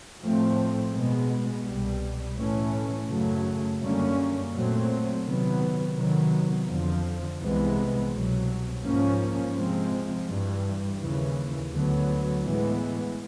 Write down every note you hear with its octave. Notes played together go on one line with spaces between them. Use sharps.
A2 F3 A3 C4
B2 G#3 B3
C2 B2 G3
A2 E3 A3 C#4
F#2 C#3 F#3 A3
F#2 D3 G3 A#3 C#4
A#2 F#3 A3 C4
C3 D#3 F#3 B3
C3 D#3 F#3 B3
F2 D3 F3
C2 C3 E3 G#3 B3
C2 B2 F#3
G#2 F3 A#3 C#4
C3 F3 G#3 C4
G2 E3 G3
D#2 C#3 E3
D2 D3 F#3 B3
A2 E3 G#3 B3